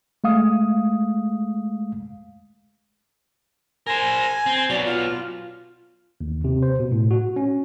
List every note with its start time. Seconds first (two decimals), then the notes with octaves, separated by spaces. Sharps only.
0.24 G#3 A3 F5 D#6
3.87 A#4 C5 G#5
4.46 C4
4.69 B2 F#3 D5
4.86 F4
6.21 D#2
6.44 C3
6.63 C5
6.80 B2
6.91 A2
7.11 F#4
7.36 C#4